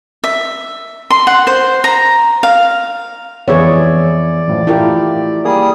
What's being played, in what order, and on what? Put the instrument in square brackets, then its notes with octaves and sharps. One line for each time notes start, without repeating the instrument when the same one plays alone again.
[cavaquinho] E5
C6
F#5
C5
A#5
F5
[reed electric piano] F2 B3 E5 [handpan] E3 G#4 C#5 [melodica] D5
[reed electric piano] F#2 A2 F3
[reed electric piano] A3 G4 [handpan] E4 F4 A#4
[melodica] G3 D#6 [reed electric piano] A#3 G#4